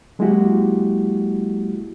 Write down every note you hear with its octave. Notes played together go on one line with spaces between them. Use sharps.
F#3 G#3 A#3 E4 F#4 G4